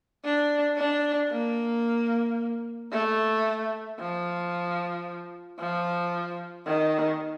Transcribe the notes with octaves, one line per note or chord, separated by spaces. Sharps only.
D4
D4
A#3
A3
F3
F3
D#3